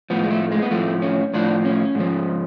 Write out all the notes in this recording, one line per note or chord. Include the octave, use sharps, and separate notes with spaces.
A2 F3 B3
G#3
A3
G#3
B3
A2 F3 A3
C#4
A2 F3 D4
C#4
G#2 F3